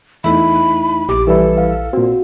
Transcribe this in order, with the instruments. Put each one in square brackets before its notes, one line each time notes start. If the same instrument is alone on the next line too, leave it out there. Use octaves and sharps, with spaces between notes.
[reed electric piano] E2 A3 D#4 [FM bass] E4 [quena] B5
[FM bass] A#1 [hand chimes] G4 [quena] D6
[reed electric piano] E3 G3 E4 [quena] A4 [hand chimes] B4
[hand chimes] F5
[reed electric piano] A#2 C4 [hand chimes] F#4